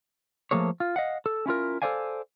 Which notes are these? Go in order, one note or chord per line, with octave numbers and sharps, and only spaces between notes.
F3 A3 A#3 G#4 C#5
F4
D#5 F5 F#5
A4
C#4 E4 F4 A#4
A4 A#4 C5 D5 F5 G#5